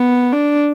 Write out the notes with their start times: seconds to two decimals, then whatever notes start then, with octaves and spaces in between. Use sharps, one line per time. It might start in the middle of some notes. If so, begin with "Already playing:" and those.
Already playing: B3
0.33 D4